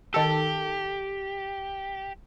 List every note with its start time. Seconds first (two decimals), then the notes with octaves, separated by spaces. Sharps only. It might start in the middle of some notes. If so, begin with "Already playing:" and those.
0.14 D#3 G4 A4